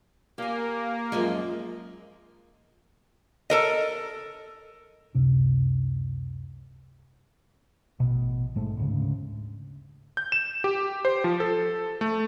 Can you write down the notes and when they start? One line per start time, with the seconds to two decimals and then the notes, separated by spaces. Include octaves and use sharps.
0.38 A#3 G4 G#5
1.12 F#2 F3 G#3
3.50 A4 A#4 D#5
5.15 C#2 F#2 C3 D4
8.00 A1 B2
8.56 G#2 G#3 A3
8.77 D2 G#2 C#3
10.17 G6
10.32 E7
10.64 G4
11.05 C5
11.24 F3
11.40 A4
12.01 A3